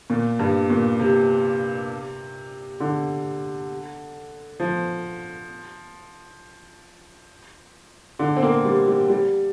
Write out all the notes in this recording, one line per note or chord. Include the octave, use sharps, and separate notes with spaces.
A#2
G2
A#2
C3
D3
F3
D3
C4
A#3
G3
G3
G3